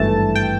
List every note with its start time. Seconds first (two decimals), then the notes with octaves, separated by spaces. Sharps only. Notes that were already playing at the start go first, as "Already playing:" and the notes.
Already playing: G#1 G2 E3 A3 A5
0.35 G5